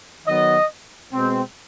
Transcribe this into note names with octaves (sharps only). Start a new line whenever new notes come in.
D#3 F#3 B3 D#5
B2 G#3 C4